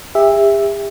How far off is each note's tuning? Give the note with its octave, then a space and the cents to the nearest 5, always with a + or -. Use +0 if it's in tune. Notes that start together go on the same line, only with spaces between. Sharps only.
G4 +45 E5 +0